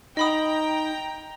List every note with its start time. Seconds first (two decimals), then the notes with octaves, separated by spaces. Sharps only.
0.17 D#4 D#5 G5 A#5 B5 D#6